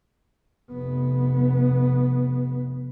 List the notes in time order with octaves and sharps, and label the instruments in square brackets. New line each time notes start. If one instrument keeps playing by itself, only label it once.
[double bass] F1 B3